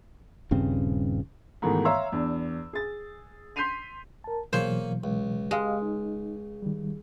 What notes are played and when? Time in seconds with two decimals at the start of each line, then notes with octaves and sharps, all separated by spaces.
0.51 D#1 G2 C#3 C4
1.62 G#2 B2 D#3 E3 A3
1.85 C#5 E5 F5 A#5 C6 E6
2.12 E2 D4
2.73 G#4 A6
3.56 C6 G6 B6 C7 D#7 F7
4.24 A#4 A5
4.53 B2 E3 F#3 A#3 G#4 C5 C#5
5.04 C#2
5.51 G#3 G4 D#5 F5
5.82 D#4
6.62 D#3 G3